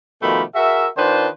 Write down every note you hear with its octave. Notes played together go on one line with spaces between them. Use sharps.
B2 D#3 F3 A3 G4 B5
F#4 G#4 A#4 E5
D#3 D4 F4 B4 C5